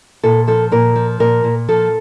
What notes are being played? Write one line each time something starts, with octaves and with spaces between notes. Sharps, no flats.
A#2 A4
F3 A4
A#2 A#4
F3
A#2 A#4
A#2
F3 A4